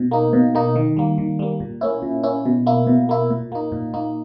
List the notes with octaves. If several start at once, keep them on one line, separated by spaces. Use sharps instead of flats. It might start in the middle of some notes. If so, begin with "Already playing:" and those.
Already playing: B2
A#3 D#4
B2
A#3 D#4
D#3
G3 A#3
D#3
G3 A#3
A#2
A#3 C#4 E4
A#2
A#3 C#4 E4
B2
A#3 E4
B2
A#3 E4
A#2
A#3 D#4
A#2
A#3 D#4